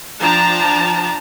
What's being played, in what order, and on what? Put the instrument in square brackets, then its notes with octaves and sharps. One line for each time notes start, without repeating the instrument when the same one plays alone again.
[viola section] F3 D4 G5 A5 A#5